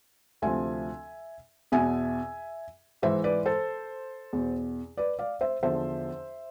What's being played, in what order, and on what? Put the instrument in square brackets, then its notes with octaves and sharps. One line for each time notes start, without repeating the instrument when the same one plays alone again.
[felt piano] D2 C3 F3 E5 G#5
E2 B2 E5 G#5
G#2 E3 C5 E5
B4 D5
A4 C5
E2 B2
B4 D5
D5 F5
C5 E5
E2 D3 F3 C5 E5